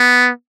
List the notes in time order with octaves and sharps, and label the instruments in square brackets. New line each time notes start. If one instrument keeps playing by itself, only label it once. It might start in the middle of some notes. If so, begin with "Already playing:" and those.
Already playing: [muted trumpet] B3